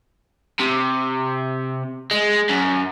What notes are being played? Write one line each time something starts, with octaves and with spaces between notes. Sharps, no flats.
C3
G#3
F#2